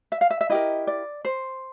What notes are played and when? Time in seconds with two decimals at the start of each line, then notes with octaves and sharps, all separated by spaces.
0.12 E5
0.21 F5
0.30 E5
0.41 E5
0.50 E4 G4 A#4 D#5
0.87 D5
1.25 C5